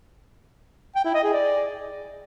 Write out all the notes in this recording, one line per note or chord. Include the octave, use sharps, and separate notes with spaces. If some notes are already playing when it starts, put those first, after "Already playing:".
G5
E4
D#5
G#4
D5